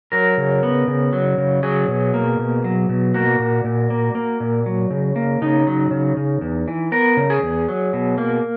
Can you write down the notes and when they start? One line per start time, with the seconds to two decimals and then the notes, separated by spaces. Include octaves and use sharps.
0.12 F#3 A#4
0.38 C#3
0.63 B3
0.87 C#3
1.13 F#3
1.38 C#3
1.63 F#3 G#4
1.88 B2
2.14 A#3
2.39 B2
2.64 F#3
2.89 B2
3.14 A#3 F#4
3.39 A#2
3.64 A#2
3.90 A#3
4.15 A#3
4.40 A#2
4.66 F#3
4.91 C#3
5.16 A#3
5.42 C#3 D#4
5.67 F#3
5.91 C#3
6.17 C#3
6.41 E2
6.68 E3
6.92 B3 A#4
7.17 C#3
7.30 G#4
7.42 E2
7.68 F#3
7.93 B2
8.18 A#3